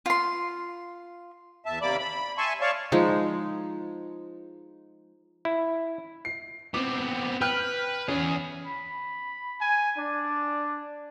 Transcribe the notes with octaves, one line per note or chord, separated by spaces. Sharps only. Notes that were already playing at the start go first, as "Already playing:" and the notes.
F4 C6
E2 E5 A5
D#2 C3 A#3 D5 B5 D6
B5
E5 G#5 A5 C6 C#6
C#5 D5 F5 A5 C#6
F3 G#3 D#4
E4
C7
B3 C4 D6
B4 G5 F6 G6
E2 C#4 G#4
B5
G#5
D4 D5